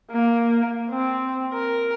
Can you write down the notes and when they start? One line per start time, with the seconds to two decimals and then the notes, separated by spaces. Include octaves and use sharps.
0.11 A#3
0.90 C4
1.54 A#4